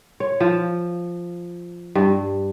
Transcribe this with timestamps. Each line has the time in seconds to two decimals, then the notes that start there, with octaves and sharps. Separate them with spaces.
0.20 C#5
0.40 F3
1.95 G2